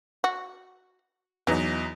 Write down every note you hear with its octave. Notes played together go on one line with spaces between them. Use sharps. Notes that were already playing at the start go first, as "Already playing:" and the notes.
F#4
E2 E3 F#3 D#4